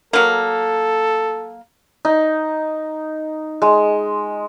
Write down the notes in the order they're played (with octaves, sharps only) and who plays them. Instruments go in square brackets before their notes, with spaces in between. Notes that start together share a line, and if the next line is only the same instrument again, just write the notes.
[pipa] F#3 A#3 [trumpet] A4
[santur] D#4
G#3